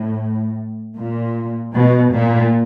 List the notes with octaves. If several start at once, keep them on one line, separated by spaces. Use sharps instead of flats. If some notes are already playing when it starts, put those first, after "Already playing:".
Already playing: A2
A#2
B2
A#2